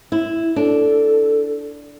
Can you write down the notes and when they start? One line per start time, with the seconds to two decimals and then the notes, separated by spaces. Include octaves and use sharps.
0.12 E4
0.56 D4 A4